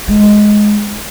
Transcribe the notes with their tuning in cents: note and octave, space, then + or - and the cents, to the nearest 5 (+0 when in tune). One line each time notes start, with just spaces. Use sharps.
G#3 +5